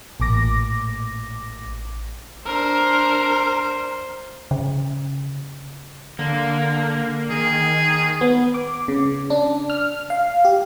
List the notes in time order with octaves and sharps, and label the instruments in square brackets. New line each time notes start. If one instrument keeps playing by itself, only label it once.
[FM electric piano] A1 A#2 D6 A#6
[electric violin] D4 A#4 [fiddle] C5
[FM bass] C#3
[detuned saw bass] D3 [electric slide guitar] A#3
[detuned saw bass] D#3 [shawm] G#4
[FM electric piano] B3
D6
C#3
D4
F6
F5
G4